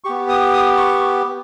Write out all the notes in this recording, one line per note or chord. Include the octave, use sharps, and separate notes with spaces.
B3 G4 C#6
D#6
D#6
C#6